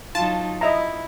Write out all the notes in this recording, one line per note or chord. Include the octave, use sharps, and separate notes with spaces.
F#3 D#4 F4 A5
E4 D#5 E5 A#5